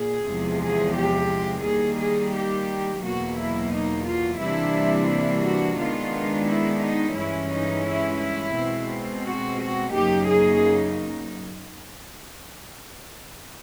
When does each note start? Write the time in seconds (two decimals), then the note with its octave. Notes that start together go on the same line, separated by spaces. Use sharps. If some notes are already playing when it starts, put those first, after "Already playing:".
Already playing: A#2 G#4
0.25 E2 C3 F3 G#3
0.60 G#4
0.94 G4
1.63 D#3 G3 A#3 G#4
1.98 G#4
2.32 G4
3.01 E2 B2 F#3 A#3 F#4
3.36 E4
3.71 D#4
4.06 F4
4.40 C3 E3 G3 A#3 D4 E4
5.09 E4
5.43 F#4
5.78 D#3 G#3 B3 D4 F4
6.47 E4
6.82 D#4
7.16 G2 E3 G#3 C#4 E4
7.51 D#4
7.86 E4
8.19 E4
8.54 B2 G#3 C4
9.24 F#4
9.59 F#4
9.92 F#2 C#3 F#3 A#3 D#4 G4
10.28 G#4